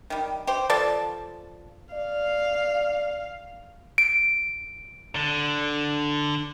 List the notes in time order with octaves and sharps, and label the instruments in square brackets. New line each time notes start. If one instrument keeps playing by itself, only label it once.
[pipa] D#3 G3
G4 C5
F3 A4 D5 A5
[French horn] D5 [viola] F5
[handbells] D7
[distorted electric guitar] D3